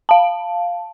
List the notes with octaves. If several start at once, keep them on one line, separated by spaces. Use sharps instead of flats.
F5 A5